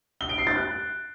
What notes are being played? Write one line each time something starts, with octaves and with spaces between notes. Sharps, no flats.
G7
D7
C7
A6
F#6